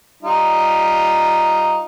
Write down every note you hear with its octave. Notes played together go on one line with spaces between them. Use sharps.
G3 D#4 F4